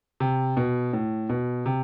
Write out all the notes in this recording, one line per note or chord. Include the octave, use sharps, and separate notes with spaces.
C3
B2
A2
B2
C3